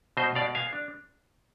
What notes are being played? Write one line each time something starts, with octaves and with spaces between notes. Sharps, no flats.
B2 C5 D#5
B2 D5 F5
B3 F5 G#5
D4